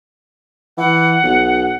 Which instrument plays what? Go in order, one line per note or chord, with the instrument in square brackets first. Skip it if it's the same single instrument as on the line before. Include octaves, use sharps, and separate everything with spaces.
[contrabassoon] E3 [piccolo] F#5
[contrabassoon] B1